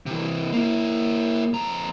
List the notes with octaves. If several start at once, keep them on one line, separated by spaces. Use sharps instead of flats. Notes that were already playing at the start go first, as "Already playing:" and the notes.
C3 E3
A#3 E4
F2 A#5